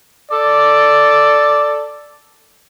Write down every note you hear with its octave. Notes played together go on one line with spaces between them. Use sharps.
A4 D5